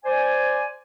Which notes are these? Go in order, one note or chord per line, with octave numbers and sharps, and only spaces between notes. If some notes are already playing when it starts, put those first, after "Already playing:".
C5 D5 G#5